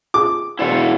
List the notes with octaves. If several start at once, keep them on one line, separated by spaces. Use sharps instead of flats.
F4 G#4 D6
E1 E4 F4 C5 D5 F#5